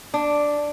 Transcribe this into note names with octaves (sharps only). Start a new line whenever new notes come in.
D4